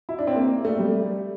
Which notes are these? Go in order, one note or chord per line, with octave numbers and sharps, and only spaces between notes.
E4
D4
C4
A#3
A3
G3